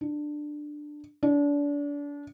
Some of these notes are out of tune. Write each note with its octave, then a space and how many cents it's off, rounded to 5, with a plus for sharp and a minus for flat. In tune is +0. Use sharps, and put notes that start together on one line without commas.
D4 +15
D4 -30